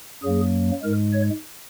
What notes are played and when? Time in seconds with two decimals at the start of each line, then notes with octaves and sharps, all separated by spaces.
0.23 F#2 F#3 A#3 G#4
0.82 G#2 G#3 A#4
1.13 C#5